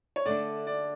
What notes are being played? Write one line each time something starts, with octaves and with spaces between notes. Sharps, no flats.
C#5
D3 A3 D4 D5
D5